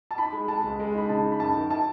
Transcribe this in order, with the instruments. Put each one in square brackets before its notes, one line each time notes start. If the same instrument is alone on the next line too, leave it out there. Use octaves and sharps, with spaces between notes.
[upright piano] A5
[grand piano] D#4 [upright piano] B5
[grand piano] G#3
[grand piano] G#3 [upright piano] A5
[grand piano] C#2
G#3
[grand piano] D#4 [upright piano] B5
[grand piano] C#3 [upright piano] A5
[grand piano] D#4
[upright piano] B5
[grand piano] F#2 [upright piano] A5
[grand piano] D#3
[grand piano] E4 [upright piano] A5